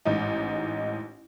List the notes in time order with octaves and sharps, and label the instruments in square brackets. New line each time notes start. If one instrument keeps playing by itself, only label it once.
[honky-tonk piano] A1 G#2 D#4